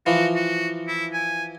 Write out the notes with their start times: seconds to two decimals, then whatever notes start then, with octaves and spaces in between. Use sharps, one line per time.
0.06 E3 F3 F#4
0.35 F#4
0.88 E4
1.13 G#5